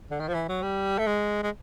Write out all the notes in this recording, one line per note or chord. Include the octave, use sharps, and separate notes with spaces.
D3
D#3
F3
E3
F#3
G3
A3
G#3
G#3